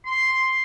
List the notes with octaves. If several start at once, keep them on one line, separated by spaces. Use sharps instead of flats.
C6